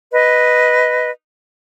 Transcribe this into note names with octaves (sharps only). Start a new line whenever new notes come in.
B4 D#5